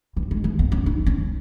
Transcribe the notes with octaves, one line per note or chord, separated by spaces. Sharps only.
E3
G#3
E3
B3
C#4
D#4
C#4